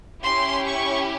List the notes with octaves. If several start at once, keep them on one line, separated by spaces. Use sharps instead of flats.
C#4 E4 G4 C6
C#6